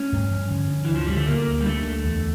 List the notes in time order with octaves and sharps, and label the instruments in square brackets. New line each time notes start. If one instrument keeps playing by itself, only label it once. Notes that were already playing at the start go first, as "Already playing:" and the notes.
Already playing: [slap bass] A3 [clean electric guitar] C#4
[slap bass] G2
F3
D3
D4
[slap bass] D2 [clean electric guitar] E3
[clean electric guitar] F3
[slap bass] D3 [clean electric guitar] G3
[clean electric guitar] A3
[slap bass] D3 [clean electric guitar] A#3
[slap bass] D2
[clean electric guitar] G3
[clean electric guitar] A3 [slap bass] D4
[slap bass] D2
E2